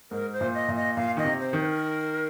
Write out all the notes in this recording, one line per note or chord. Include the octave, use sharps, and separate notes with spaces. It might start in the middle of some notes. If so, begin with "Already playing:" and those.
G#2 A#4
C5
A#2
D#5
A#2
D#5
A#2 F5
D#3 D#5
C3
C5
D#3
C5
A#4